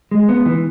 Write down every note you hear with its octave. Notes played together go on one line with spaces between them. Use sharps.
G#3
B3
E3